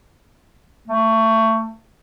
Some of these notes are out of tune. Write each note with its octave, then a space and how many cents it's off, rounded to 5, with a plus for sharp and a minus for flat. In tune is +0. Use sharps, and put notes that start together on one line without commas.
A3 +25